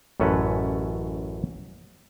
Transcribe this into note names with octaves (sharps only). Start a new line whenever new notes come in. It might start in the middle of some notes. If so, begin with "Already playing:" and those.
A1 F#2 C#4 A4 B4